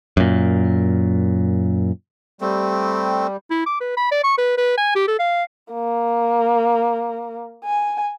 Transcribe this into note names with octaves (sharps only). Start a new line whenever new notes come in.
F#2 A#2
G3 A3 C4
E4
D6
B4
B5
D5
C#6
B4
B4
G#5
G4
A4
F5
A#3
G#5